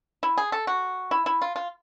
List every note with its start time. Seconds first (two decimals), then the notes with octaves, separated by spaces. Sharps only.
0.23 E4
0.38 G#4
0.52 A4
0.67 F#4
1.11 E4
1.26 E4
1.42 F4
1.56 F4